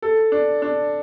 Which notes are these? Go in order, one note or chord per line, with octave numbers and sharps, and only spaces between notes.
A4
D4
D4